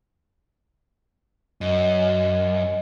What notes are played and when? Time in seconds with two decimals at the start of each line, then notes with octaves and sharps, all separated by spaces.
1.61 F#2 D#5